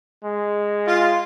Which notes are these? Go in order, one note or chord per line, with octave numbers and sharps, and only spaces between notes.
G#3
F4